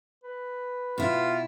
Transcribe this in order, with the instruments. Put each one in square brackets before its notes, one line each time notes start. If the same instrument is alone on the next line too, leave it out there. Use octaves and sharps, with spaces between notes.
[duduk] B4
[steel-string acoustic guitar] B2 E4 [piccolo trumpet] F4